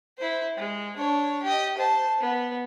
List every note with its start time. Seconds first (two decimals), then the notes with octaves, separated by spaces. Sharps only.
0.18 E4 C5
0.57 G#3
0.97 D4 C#5
1.43 G4 D#5
1.77 C5 A5
2.20 B3